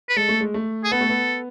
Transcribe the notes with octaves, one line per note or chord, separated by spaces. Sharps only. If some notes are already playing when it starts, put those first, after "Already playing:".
B4
G#3 A4
A3
G#3
A3
G#4
B3 A4
A3
B3